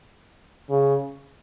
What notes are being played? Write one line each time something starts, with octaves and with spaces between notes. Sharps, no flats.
C#3